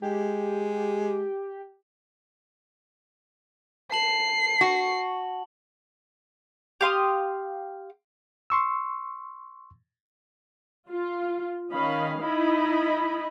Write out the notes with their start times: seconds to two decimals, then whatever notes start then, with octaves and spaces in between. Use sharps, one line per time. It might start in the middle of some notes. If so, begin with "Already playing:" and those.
0.02 G#3 G4
3.92 A5 C7 F#7
4.61 F#4
6.81 G4 F5 C6 D#6
8.50 C6 C#6 E6
10.91 F4
11.73 D#3 C#4 D#5 F5 B5
12.21 D#4 E4 D#5 B5